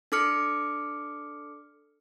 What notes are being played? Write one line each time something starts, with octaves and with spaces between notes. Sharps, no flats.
D4 A4 D6 F6 C#7